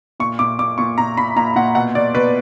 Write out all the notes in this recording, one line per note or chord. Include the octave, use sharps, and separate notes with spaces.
A#2 C#6
A#2 D6
A#2 D6
A#2 C#6
A#2 A#5
A#2 B5
A#2 A#5
A#2 F#5
B2 F#5
B2 D5
B2 B4